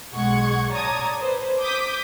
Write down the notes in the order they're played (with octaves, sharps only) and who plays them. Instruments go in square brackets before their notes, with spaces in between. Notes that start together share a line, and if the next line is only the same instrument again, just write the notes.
[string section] B1 G#3 F#5 C#6 G#6
C#5 D5 A5 A#5 D#6 G#6
B4 C5
D6 D#6 G6 B6